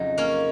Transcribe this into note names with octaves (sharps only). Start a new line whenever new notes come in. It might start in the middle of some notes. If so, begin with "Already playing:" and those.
Already playing: F2 C#3 F#3 D#4
A#3 C#4